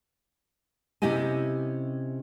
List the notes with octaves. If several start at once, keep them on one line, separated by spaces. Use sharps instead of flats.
C3 C#4 E4 G4 D#5 G#5